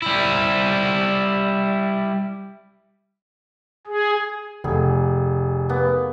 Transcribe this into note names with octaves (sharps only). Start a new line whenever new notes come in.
G3 E4
G#4
F1 G#4
A#3 B3